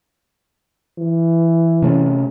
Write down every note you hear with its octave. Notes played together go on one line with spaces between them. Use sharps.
E3
C3 A3 C#4